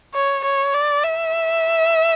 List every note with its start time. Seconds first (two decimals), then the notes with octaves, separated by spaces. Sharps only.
0.14 C#5
0.44 C#5
0.74 D5
1.04 E5